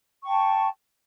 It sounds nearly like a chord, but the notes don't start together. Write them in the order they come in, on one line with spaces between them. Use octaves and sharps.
C#6 G5 A5